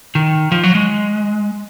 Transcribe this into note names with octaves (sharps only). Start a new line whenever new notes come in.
D#3
F3
F#3
G#3